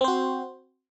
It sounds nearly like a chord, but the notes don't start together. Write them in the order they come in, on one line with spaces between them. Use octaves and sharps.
C4 C5 F#4